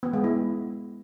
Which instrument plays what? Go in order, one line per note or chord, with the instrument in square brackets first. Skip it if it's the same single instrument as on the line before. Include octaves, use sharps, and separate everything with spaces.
[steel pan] B3
G#3
E4